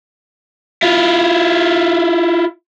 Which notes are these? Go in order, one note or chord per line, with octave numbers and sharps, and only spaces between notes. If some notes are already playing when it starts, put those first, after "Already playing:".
E4 F4